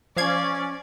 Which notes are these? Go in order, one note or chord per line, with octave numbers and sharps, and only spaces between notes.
F3 C#4 D5 F5 G#6